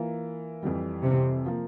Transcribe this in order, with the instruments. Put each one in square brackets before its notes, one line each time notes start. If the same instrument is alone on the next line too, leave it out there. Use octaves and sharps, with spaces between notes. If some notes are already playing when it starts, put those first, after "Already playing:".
Already playing: [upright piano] E3 A#3 F4
F2 E3 G3
[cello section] C3
[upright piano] F3 A#3